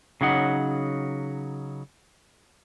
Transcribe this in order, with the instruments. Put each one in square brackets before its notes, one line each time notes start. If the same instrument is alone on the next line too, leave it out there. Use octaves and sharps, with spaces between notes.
[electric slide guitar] C#3 F#3 D#4 F#5